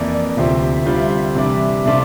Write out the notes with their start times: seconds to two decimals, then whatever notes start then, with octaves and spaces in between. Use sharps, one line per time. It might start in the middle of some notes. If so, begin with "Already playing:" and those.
Already playing: F2 E3 A#3 E4 D5
0.36 D2 C3 F3 C4 E5
0.86 D3 G3 C4 F4
1.35 C3 E3 G3 D4 E5
1.86 C3 F3 A3 D4 F4